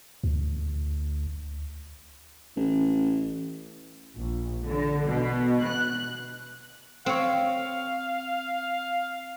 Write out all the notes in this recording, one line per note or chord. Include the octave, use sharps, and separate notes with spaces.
D2
A1
A#1
D3
B2
F#6
C4 C#5 F5